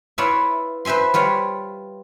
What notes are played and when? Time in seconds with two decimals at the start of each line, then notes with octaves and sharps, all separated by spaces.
0.18 E4 F4 B4 C#5 D5 E5
0.85 B4 C5 E5 G#5 C6
1.14 G3 F4 B4 C#5